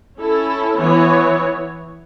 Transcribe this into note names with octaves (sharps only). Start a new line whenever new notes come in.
C#4 E4 A4
E3 B3 E4 C#5